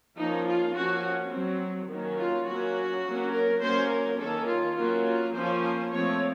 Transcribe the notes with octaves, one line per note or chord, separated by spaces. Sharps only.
F3 A#3 C#4 D#4
F4
F3 A#3 C#4 F#4
F#3 C4
D#3 F#3 A#3 C#4
F4
F#3 A#3 C#4 F#4
F#3 A#3 C#4
A#4
F#3 A#3 C#4 C5
A#4
D#3 A#3 C#4 A4
F4
F#3 A#3 C#4 F4
F4
F3 A#3 C#4 C5
C5
F3 A3 C4 C#5